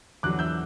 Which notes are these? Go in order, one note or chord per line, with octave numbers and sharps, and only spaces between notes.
E2 D3 F#3 D6 F#6
E6 G6